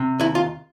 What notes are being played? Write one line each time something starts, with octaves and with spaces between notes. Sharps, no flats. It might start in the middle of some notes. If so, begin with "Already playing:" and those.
Already playing: C3
D#2 E4
F4